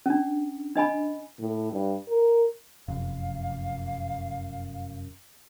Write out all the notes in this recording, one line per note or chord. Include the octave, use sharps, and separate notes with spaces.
C#4 D4
D4 D#5 G#5 B5
A2
G2
A#4
F1 F#2 F5